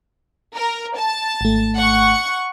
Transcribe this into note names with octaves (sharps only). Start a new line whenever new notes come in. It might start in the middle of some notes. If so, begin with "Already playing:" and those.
A#4
A5
G#1 A3
F#5 C#6